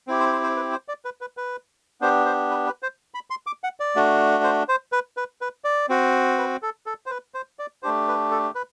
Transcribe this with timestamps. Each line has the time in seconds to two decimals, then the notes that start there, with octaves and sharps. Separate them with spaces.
0.07 C4 E4 G4
0.20 C5
0.32 C5
0.43 C5
0.56 B4
0.72 C5
0.88 D5
1.05 B4
1.21 B4
1.37 B4
2.01 B3 D4 G4 C5
2.26 C5
2.51 B4
2.66 B4
2.83 C5
3.14 B5
3.30 C6
3.47 D6
3.64 F#5
3.80 D5
3.95 A3 D4 F#4
4.44 C5
4.69 C5
4.92 B4
5.17 B4
5.41 B4
5.64 D5
5.89 C4 F#4
6.38 B4
6.62 A4
6.86 A4
7.06 C5
7.11 B4
7.34 C5
7.59 D5
7.83 A3 D4 G4 C5
8.08 B4
8.31 A4
8.55 B4